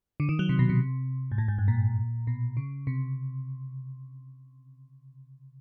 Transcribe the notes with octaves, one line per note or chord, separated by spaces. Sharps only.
D3
D#3
F#3
C3
B2
C3
G#2
A2
G#2
G2
A#2
B2
C#3
C3